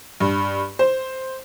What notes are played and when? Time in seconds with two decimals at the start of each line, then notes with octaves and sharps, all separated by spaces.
0.20 G2
0.79 C5